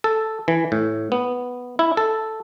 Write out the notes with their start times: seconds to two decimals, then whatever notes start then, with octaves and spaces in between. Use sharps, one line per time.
0.04 A4
0.48 E3
0.72 A2
1.12 B3
1.79 E4
1.97 A4